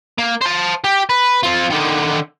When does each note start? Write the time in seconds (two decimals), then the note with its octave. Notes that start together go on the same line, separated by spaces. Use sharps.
0.19 A#3
0.42 C5 A5
0.84 G4
1.10 B4
1.43 C4 F4
1.70 D3 D#3